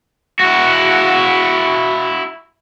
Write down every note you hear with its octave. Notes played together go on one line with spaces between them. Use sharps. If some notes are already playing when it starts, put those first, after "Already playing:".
E4 F#4